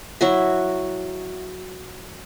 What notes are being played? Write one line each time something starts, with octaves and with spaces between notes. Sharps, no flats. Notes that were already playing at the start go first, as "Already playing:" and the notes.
F#3 E4 F#4 E5